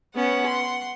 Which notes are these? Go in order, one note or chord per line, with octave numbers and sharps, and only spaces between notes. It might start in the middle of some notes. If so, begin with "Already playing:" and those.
B3 C#4 F#5
C6